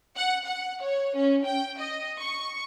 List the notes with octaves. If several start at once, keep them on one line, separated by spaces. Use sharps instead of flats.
F#5
F#5
C#5
C#4
G5
D#5
C#6